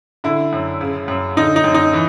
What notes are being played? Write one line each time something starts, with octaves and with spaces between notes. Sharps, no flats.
D3 E4
F#2
C#3
F#2
D3 D#4
D#4
F#2
D#4
E3